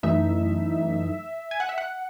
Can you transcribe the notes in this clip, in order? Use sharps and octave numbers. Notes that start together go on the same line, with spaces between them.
F#2 E3 A3 D#4 E5
G#5
F#5
E5
F#5